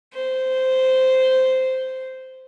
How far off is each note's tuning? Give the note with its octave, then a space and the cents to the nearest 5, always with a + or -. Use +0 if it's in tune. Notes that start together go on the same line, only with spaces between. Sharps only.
C5 -10